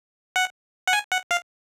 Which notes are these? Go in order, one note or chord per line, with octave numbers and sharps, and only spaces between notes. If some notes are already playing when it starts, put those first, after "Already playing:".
F#5
F#5
G#5
F#5
F5